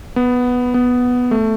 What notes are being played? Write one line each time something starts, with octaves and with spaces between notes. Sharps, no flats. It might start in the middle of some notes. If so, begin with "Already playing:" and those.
B3
B3
A3